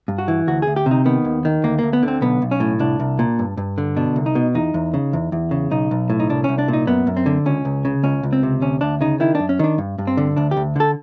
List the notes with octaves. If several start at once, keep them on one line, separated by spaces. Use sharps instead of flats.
G2
F#4
E3
D2 F#4
D2 G#4
G4
C3
D#4
D#3 B3
D#2
D#3
D2 A#3
D2 A#3
B3
D3
C4
B1 B3
B1
C#4
A2
C2 D4
C2
A#2
G2
G2
D3
B2 D4
C2
D#4
B2
E2 D#4
E2
C#3
E2
E2
C#3
B1 D#4
B1
A2
D#4
C2 D4
C2 C#4
D4
A#2
D#4
F#2 B3
F#2
C4
D3
C#2 C#4
C#2
C#3
C#2 C#4
C#2
C4
C3
D2 C#4
D2 D4
C#3 D#4
D#3 E4
F#2 D4
C#4
D#3 D4
G2
G2
C4
D3
D2 D4
G4
D2
D3 A4